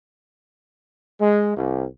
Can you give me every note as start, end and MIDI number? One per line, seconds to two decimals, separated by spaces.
1.19 1.54 56
1.56 1.84 36